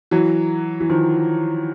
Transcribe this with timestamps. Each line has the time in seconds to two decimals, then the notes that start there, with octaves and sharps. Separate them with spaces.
0.11 E3 F#3
0.80 E3
0.89 D#3 F3